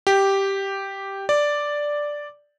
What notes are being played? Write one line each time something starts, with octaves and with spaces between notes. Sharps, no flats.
G4
D5